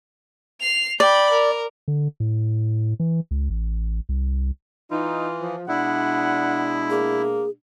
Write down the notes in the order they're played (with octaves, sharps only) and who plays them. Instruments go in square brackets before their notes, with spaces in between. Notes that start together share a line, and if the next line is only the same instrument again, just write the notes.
[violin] C7 F7
[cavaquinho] D5 [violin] G5 B5
[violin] A#4
[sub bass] D3
A2
E3
C#2
A1
C2
[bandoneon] E3 [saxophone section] D#4 [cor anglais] F4
[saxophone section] F3
[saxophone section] B2 G#3 D4 [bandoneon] E4 [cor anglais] F#5
[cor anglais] A#3 [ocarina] G#4